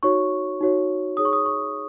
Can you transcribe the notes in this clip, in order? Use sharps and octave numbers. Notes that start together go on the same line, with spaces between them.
D#4 F#4 C#5 C#6
D#4 F#4 C#5
D#4 G#4 C#5 D#6
C#6
D#6
C#6